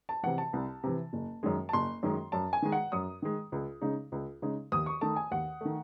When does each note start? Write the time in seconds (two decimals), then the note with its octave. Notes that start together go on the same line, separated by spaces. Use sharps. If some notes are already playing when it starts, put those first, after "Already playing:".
0.09 A5
0.23 C3 E3 F#5
0.38 A5
0.53 C2
0.83 C3 E3
1.13 F#1
1.43 F#2 D#3 G#3
1.69 A5
1.73 F#1 C6
2.03 F#2 D#3 G#3
2.32 F#2 A5
2.53 G#5
2.62 D#3 G#3
2.72 F#5
2.92 F#2 D#6
3.22 D#3 G#3
3.52 C#2
3.81 C#3 G#3 D#4
4.12 C#2
4.42 C#3 G#3 D#4
4.72 D#2 D#6
4.86 C#6
5.01 D#3 A3 A5
5.16 G#5
5.31 D#2 F#5
5.61 D#3 A3